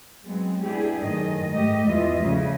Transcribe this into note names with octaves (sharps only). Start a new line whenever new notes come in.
F#3 G#3 B3 C4
B3 D4 E4 G4 G#4
F#2 A2 D#3 D#5
G#2 A3 G4 D#5
E2 E3 G#3 F4 D#5 E5
A2 C#3 F3 G3